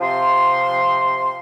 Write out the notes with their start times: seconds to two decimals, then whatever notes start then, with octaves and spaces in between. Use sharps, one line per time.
0.01 C3 F3 C6